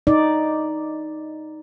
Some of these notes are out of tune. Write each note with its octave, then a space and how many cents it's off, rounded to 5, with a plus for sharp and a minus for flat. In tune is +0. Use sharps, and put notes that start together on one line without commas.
D#4 +0 D5 +0